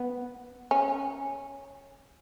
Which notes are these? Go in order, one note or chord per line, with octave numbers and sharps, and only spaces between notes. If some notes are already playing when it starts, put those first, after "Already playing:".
Already playing: B3
C#4